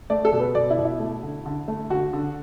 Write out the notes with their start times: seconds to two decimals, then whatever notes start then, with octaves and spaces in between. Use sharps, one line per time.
0.10 A3 D5
0.25 A4
0.32 B2
0.40 B4
0.55 B2 D5
0.70 E4
0.78 B2
0.85 E4
1.00 A3
1.23 D3
1.46 D3
1.68 A3
1.90 D3 F#4
2.13 D3